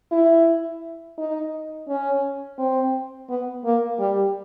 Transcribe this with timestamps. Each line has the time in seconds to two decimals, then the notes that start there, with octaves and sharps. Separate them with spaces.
0.12 E4
1.18 D#4
1.89 C#4
2.59 C4
3.29 B3
3.65 A#3
3.99 G3